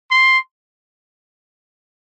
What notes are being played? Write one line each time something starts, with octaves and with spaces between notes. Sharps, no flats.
C6